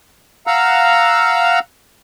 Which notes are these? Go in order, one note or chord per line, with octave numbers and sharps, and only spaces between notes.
F5 F#5 A#5 E6